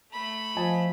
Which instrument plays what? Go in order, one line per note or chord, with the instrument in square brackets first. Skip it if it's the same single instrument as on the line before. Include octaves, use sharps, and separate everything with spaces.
[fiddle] A3 B5
[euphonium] F3 [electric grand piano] D#5 G#5 A5